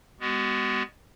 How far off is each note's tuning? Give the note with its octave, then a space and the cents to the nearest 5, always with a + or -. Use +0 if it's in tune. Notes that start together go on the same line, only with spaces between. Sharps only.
G#3 -20 B3 +15 F#4 +35